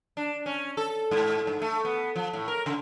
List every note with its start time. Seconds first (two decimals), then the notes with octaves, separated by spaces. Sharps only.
0.17 D4
0.46 C#4
0.77 A4
1.11 G#2
1.47 G2
1.62 A3
1.85 B3
2.16 F3
2.33 A2
2.48 A#4
2.66 C#3